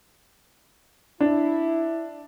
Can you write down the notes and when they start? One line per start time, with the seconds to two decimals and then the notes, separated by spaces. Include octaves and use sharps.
1.21 D4 E4